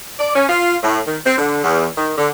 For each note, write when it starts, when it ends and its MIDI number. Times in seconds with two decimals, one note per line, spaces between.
0.19 0.33 74
0.36 0.45 61
0.49 0.77 65
0.83 1.01 45
1.07 1.19 51
1.26 1.36 60
1.38 1.62 50
1.64 1.87 40
1.97 2.13 51
2.18 2.30 50